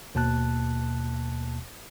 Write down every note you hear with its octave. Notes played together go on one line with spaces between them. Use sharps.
D#2 B2 A#3 A5 F#6